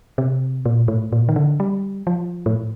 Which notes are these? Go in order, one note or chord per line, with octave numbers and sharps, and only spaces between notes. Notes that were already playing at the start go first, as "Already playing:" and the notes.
C3
A#2
A2
A#2
D#3
D3
G3
F3
A2